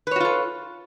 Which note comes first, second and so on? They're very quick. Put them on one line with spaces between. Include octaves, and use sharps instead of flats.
B4 C#5 F#4 F4 A4